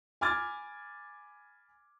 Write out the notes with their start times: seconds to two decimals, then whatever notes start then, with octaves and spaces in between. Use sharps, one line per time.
0.21 G#5 B5 D6 F6 G#6 A6